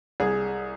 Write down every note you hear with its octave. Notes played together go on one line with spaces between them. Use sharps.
C2 G#4